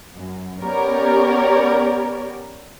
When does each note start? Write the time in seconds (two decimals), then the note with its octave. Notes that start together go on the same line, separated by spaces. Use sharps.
0.14 F#2
0.62 B3 C#4 G4 A#4 C#5 D5